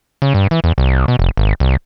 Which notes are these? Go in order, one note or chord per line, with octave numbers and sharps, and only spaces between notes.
C#3
G2
E3
E2
C2
B2
F1
G#1
C2